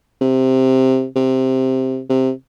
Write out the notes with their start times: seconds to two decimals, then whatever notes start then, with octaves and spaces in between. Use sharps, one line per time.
0.21 C3
1.16 C3
2.10 C3